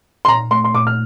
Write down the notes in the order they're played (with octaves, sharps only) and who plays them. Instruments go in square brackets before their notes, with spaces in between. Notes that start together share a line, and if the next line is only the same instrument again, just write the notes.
[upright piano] C6
[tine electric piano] A#2 [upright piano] A#5
[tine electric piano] A3 [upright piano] C6
[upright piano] C6
[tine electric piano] A#2 [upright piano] D6
[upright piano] F6